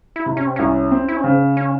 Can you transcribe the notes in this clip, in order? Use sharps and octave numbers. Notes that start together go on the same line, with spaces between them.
E4
C3
C#4
C4
C2 C#4
C4
E4
C#4
C#3 C4
C#4